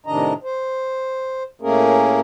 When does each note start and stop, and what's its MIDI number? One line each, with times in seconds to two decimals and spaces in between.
0.06 0.33 45
0.06 0.33 48
0.06 0.33 51
0.06 0.33 62
0.06 0.33 75
0.06 0.33 82
0.44 1.43 72
1.62 2.20 45
1.62 2.20 57
1.62 2.20 58
1.62 2.20 61
1.62 2.20 68
1.62 2.20 70